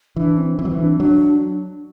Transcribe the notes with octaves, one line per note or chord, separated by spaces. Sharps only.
E3 D4
C4
E3 C4
F#3
E3
D4
F#3 D4